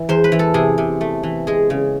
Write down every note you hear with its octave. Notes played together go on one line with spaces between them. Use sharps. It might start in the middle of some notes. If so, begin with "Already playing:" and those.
Already playing: E3
E2 C5
B4
E3
A4
C3 G#4
C3
A3
E3
G#3 G#4
C#3